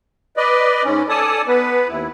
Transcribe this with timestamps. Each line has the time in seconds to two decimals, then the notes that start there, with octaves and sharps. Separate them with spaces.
0.37 B4 D5 D#5
0.84 G#2 C#4
1.09 A4 D5 G#5 A5 D#6
1.48 B3 B4
1.88 D#2 E4